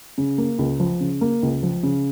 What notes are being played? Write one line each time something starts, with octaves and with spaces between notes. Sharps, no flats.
C#3
A#3
C#2
F3
C#3
A#3
C#2
F3
C#3